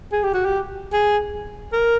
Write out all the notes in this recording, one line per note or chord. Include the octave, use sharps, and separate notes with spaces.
G#4
G4
F#4
G4
G#4
A#4